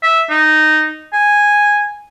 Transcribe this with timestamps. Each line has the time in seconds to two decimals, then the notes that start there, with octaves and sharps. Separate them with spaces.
0.02 E5
0.30 D#4
1.13 G#5